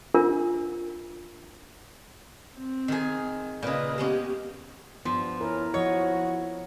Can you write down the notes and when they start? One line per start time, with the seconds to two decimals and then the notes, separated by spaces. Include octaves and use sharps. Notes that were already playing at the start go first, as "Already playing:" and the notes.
0.14 D4 F4 A#4
2.57 C4
2.88 D#3 G#4
3.63 A#2 C#3 B4 D#5
3.98 G#3 B3 C#4 G4
5.05 G2 F3 G3 B3
5.41 C#4 E4 A#4
5.74 F3 F#4 C#5 D#5